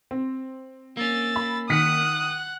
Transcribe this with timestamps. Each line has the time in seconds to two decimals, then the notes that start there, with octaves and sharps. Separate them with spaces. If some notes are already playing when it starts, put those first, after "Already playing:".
0.11 C4
0.97 A#3 C#4 E6 A6
1.36 B5
1.70 D#3 F#5 D#6 F#6 B6 C#7